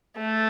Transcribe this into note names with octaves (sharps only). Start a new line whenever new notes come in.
A3